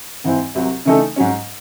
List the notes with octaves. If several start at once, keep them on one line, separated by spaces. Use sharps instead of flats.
G#2 E3 C4 E4
C2 C3 F#3
C#3 E3 A3 D#4 A4
G#2 F#3 C#4